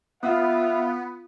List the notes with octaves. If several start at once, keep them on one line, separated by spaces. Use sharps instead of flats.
B3 F4 E5 F5